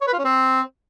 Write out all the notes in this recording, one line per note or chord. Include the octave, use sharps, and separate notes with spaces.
C#5
B4
F4
C#4
C4